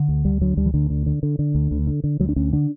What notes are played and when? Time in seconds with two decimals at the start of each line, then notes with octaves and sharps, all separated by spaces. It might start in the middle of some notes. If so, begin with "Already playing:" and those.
Already playing: D3
0.08 D2
0.25 D2 G3
0.41 D3 F#3
0.57 D2 G3
0.66 E3
0.74 D2 D3
0.90 D3
1.06 D3
1.23 D3
1.39 D3
1.55 D2
1.71 D2
1.87 D3
2.04 D3
2.20 D2 F#3
2.29 D4
2.36 D2 C#4
2.52 D3 D4